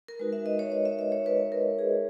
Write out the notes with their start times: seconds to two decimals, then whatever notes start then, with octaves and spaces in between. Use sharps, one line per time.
0.08 A#4
0.19 G#3 D#4 F#4 B4
0.33 E5
0.46 D#5
0.59 C#5
0.72 E5
0.85 E5
0.99 E5
1.12 C#5
1.26 B4
1.52 A#4
1.79 G#4